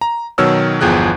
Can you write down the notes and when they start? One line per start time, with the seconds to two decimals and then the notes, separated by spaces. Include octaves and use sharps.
0.01 A#5
0.38 B2 D#3 F#3 C#5 E6 F6
0.81 G1 E2 F3 G#4 G5 F#6